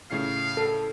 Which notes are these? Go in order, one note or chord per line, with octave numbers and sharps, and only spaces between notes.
A2 C#3 F5 C7
A4